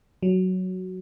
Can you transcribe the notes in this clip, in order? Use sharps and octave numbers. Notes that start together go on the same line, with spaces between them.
F#3